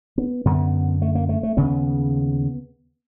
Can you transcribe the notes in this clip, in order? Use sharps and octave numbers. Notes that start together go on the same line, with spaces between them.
B3
F#2 D3 B3
A3
A#3
A3
A3
D#2 C#3 B3